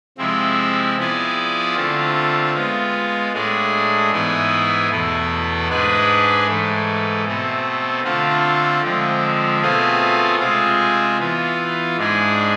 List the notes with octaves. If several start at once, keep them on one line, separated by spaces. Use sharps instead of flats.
C3 F3 G#3 C4 E4
F3 B3 E4 G#4 D5
D3 A3 C4 F4
G#3 B3 F4
A2 G#3 D4 G#4
G#2 E3 B3 E4 G#4
E2 B2 A3 E4
G#2 G#3 D4 G#4 B4
G#2 E3 A3
B2 A3 C4
D3 A3 C4 F4
D3 F3 G#3 C4
B2 A3 C4 F4 G#4
C3 G#3 C4 F4 G#4
E3 B3 F4
G#2 G#3 D4 G#4